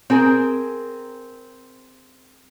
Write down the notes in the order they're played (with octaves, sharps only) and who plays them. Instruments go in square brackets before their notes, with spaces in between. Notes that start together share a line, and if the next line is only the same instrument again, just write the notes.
[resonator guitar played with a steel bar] C4 G#4 A#4